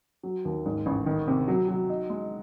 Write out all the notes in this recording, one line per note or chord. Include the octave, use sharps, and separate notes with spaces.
F#3
D#2
G#2
A1
D#3
C3
F#3
F#3
D#4
G#3